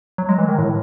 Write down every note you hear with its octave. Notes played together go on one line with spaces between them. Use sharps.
F#3
G#3
E3
D#3
A2